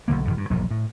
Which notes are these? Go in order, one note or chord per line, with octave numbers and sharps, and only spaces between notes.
B1 F#2 D3 A#3
E1 B1 D3
G2
E1 A#1 G#2 F#3
A2